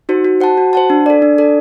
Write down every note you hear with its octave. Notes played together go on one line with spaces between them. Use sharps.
D#4 F#4 C5
F#4
C5 F#5 A5
F#4
C5 F#5 A5
D4
A4 D5
D4
A4 D5